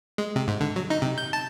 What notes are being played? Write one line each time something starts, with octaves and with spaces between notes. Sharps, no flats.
G#3
C3
G#2
D3
F#3
D#4
C3
G6
A5